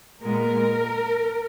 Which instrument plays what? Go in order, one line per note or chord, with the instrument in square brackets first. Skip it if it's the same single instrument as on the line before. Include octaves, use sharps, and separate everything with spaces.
[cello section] A#2 G#3 B3 A#4